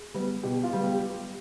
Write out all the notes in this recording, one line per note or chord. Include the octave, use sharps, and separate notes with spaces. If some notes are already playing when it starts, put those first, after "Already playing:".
Already playing: G#4
G3 B3
B2 G4
F4
G3 B3
G4